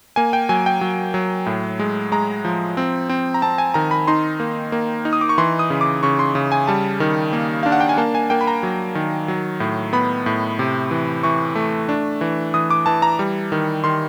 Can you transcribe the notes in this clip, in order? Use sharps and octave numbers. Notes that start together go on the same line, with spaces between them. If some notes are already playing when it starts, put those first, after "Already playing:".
A#3 G#5
G5
F#3 G#5
G5
F#3
F#3
A2
G#3
G#3 A#5
F3
C4
C4
A#5
C4 A5
G#5
D#3 A#5
B5
D#4 C6
A#3
A#3
D#4
D#6
D6
C#6
E3 C6
D#6
C#3
D6
C#3 C#6
C6
C#3
G#5
G3 A5
D#3
A#3
D4 F5
F#5
G5
G#5
A#3 A5
G#5
A#3 G5
B5
A#5
F#3
D#3
F#3
A2
B3 B5
A2
C3
E3
E3 C#6
A3
D4
E3
E3 D#6
D6
E3 A5
A#5
G3
D#3
D#3 C6